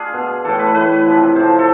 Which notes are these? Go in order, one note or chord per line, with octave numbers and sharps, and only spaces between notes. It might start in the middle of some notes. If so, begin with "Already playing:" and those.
Already playing: D4 F4 G#4
B2
A2 E3 A4
B4
A2 E3 B4
C3 F3
C3 F3 C5
A4